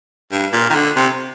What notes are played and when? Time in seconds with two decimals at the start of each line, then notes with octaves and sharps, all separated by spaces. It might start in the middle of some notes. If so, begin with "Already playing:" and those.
0.32 G2
0.53 A#2
0.70 D#3
0.75 D3
0.96 C3